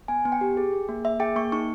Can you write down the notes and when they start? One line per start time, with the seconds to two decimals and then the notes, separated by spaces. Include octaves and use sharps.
0.08 B3 G#5
0.25 B3
0.32 G5
0.41 G4
0.57 G#4
0.73 G#4
0.89 A#3
1.05 A#3 E5
1.20 G#4 G5
1.36 A#3 C#6
1.52 D#4 C#6